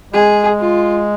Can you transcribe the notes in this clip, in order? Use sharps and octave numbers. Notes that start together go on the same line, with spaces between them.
G#3 G#4
F4